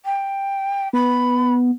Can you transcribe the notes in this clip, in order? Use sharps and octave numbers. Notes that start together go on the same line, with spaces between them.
G5
B3 B5